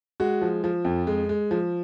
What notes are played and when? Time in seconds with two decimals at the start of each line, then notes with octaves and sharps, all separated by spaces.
0.20 G#3 F#4
0.42 F3
0.64 F3
0.85 F2
1.07 G#3
1.29 G#3
1.51 F3